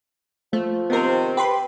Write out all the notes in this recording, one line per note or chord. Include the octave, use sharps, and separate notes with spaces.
F3 A3
C3 D#3 B3 C4 A#4
G4 B4 B5 C6